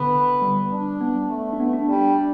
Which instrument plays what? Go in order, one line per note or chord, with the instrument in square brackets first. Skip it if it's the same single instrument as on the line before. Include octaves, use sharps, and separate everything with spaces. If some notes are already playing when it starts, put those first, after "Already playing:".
Already playing: [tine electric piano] D3 [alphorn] B3
[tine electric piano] G3
[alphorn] D4
[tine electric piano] B3
[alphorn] A3
[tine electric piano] D4
B3
D4
[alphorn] G3 [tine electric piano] D4